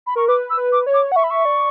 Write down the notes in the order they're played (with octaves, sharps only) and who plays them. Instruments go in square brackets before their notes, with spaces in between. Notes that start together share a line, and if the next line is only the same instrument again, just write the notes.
[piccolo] B5
[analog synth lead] A#4 [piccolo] C#6
[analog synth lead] B4 [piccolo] D6
[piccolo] E6
[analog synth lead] B4
[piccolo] D6
[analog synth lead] C#5
[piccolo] D6
[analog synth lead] F#5
[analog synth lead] E5 [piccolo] C#6
[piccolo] B5
C#6
[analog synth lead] D5